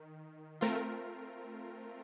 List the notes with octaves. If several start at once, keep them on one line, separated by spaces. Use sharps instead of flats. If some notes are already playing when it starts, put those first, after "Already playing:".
Already playing: D#3
A3 C4 F4 A#4